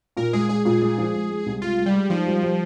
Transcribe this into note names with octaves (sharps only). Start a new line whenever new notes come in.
A#2 A#4
G#3 G#4
G#3 G#4
A#2 G#4
G#3
F3
G#3
G#3
C2
G#3 F4
G#3
G3
G#3
F3 D#4
G3
G3